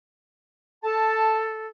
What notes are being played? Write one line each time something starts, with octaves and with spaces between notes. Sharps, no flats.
A4 A5